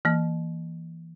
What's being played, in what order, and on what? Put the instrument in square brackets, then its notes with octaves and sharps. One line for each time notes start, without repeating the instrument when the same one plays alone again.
[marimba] E3 A#3